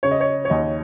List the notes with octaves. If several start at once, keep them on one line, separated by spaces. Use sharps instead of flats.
C#3 C#5
D#5
C#5
C#5
D#2 D#5